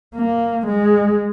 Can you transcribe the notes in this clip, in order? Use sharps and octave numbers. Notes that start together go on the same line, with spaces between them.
A#3
G#3